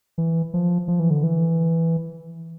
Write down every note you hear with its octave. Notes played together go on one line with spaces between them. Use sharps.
E3
F3
F3
E3
D3
E3